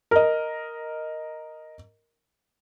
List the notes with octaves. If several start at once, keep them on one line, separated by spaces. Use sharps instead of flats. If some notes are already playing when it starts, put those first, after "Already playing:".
A#4 D#5